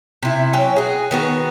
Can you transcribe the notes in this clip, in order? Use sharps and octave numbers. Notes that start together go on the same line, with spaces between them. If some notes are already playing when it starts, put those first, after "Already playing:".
C3 E4
F#3 C#4 G5
F#4 G#4
D#3 B3 F#4